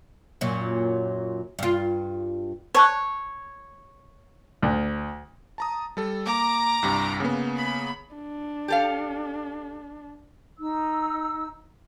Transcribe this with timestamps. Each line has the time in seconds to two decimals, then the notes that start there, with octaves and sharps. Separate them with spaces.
0.41 F#2 A#2 F#3
1.59 G2 F4
2.75 C5 C#5 A5 F#6
4.62 D2
5.58 A5 A#5 D#6
5.97 G3 A4
6.26 A#3 A#5 D6
6.82 C2 G2 C3
7.20 C#3 A#3 B3
7.57 B5
8.14 D4
8.68 G4 A4 F5
10.58 D#4 E6